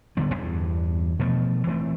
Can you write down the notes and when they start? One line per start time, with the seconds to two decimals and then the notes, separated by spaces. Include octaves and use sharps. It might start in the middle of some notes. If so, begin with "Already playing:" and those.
0.17 D1 D3 G3 B3
0.34 E2 G2
1.19 B2 F3 A3
1.67 E3 A3 C4